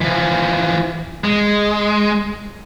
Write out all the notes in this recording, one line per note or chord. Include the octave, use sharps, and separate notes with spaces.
E3 F3
G#3